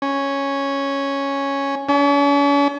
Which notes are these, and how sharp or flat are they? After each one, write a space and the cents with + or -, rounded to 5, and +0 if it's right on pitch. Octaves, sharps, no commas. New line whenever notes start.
C#4 +0
C#4 +45